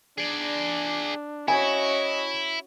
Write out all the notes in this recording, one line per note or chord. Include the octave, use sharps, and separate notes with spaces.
D4 G#4 D5
C#4 E4 F#4 D#5 G#5